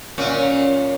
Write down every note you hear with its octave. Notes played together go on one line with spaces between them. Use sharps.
F#2 A#2 C#4